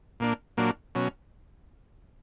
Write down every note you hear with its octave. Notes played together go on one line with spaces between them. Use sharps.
A#2 A#3 D4
A#2 F#3 A#3 D4
B2 F#3 C#4